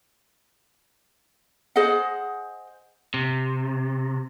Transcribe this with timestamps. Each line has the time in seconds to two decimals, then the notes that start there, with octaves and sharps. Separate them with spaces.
1.76 G#4 C5 D#5 F#5
3.14 C3